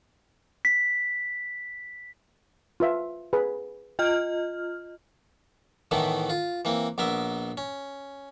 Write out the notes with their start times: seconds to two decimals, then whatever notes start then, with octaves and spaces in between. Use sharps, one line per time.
0.65 B6
2.80 F4 B4 E5
3.33 G#4 B4
3.99 F4 D#5 G5 F6
5.91 A2 D#3 E3 A3 B3
6.30 F4
6.65 E3 A#3 C4
6.98 A#1 B3 A#4 E5
7.57 C#4